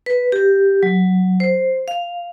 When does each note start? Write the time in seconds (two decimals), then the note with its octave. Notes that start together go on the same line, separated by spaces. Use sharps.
0.06 B4
0.32 G4
0.83 F#3
1.40 C5
1.88 F5